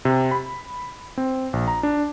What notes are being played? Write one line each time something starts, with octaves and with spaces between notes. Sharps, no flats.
C3
B5
C4
A#1
A#5
D4